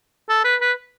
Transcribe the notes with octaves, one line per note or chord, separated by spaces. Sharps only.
A4
B4
B4